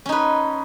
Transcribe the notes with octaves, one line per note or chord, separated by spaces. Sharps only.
C#4 D#4 B4